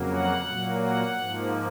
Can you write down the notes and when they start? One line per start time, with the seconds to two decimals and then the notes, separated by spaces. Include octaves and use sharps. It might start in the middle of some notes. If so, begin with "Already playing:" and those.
Already playing: F2 C#3 F#3 A#3
0.13 F#5
0.47 A#2 F#3 A#3
0.82 F#5
1.17 G#2 F3 A#3